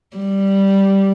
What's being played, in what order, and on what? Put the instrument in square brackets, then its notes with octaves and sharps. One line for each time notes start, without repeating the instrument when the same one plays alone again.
[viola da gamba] G3